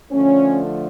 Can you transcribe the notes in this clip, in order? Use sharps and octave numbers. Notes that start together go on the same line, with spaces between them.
D3 F3 A3 C#4